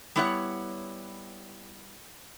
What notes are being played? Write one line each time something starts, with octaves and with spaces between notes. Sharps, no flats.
G3 B3 E4 C#5 E5 F#5